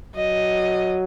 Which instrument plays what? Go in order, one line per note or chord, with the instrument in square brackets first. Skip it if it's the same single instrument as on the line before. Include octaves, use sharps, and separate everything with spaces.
[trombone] F#3 [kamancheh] D#5